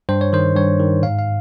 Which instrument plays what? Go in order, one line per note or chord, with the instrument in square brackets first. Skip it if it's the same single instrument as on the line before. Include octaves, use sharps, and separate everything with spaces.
[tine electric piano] G2 C5
C#5
D#3 C5
G2 C#5
D#3
G#2 F5
F5